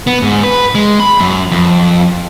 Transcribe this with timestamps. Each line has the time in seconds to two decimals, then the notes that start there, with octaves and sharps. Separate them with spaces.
0.07 B3
0.22 G#2
0.43 B4
0.75 G#3
1.00 B5
1.20 F#2
1.52 F2